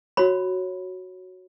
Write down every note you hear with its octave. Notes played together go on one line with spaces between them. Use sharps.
F#4 C#5 B5